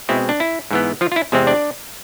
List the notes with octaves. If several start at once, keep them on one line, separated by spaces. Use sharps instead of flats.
B2 G#3 C4 E4
D4
E4
G#2 E3 B3
F3 F4
F4
E4
E2 C3 G#3 C4
D4 D5